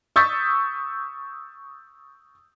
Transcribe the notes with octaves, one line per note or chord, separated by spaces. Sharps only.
C#6 D#6 E6 G6 A6 B6